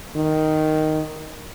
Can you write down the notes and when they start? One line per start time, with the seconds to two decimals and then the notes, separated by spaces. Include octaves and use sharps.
0.16 D#3